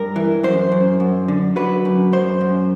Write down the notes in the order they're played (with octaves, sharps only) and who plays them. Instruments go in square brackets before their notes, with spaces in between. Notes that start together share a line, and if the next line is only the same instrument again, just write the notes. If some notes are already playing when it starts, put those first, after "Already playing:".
Already playing: [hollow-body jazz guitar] G2 A#4
E3
F#2 C5
F#2
F#2
D3
F#3 B4
F#2
F#2 C5
F#2